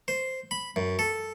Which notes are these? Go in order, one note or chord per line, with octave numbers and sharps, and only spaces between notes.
C5
B5
F#2
A4